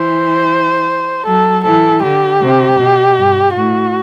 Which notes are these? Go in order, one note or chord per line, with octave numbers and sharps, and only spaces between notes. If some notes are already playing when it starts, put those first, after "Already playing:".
Already playing: E3 C5
F#3 A4
E3 A4
D3 G4
C3
B2
G2
A2 F#4